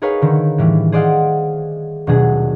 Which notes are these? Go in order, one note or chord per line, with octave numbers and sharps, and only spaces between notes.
D#4 G#4 A#4 B4 C#5 F5
D3 D#3
A2 E3 G3
G#4 C5 D5 D#5 F5 F#5
D#1 B2 F#3 D4 G#4